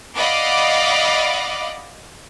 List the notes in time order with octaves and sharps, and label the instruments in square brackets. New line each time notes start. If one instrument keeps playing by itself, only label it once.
[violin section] D5 D#5 F5 F#5 B5 D6